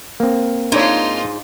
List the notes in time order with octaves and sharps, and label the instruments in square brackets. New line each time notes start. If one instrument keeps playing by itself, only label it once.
[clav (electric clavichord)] A#3 C4
[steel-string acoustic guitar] G#2 [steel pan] D4 C#5 [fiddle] D#4 F4